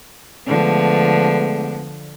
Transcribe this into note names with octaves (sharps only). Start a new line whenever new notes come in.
D3 F3 G#3 A3 B3